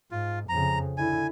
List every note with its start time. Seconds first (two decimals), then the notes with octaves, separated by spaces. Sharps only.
0.11 G#2 F4
0.49 F2 C#3 A#5
0.98 D3 E4 G#5